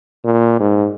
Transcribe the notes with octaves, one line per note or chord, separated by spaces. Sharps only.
A#2
G#2